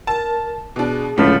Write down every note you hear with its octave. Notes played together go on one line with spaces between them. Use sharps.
A#4 A5
B2 D4 G#4
C#2 A2 D3 F3 A3